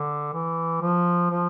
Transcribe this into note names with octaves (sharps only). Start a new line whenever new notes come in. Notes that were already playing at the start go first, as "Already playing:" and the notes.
Already playing: D3
E3
F3
F3